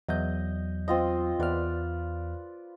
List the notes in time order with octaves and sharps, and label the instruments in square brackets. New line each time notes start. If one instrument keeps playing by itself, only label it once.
[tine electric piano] E2 F#3 G6 [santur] D#5
[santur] C4 F4 D#5
[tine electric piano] E2 F6 [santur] B4 D5